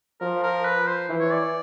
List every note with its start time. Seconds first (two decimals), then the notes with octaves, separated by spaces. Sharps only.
0.21 F3 A#4
0.43 A#4
0.65 B4
0.87 C5
1.09 E3
1.20 C#5
1.31 D5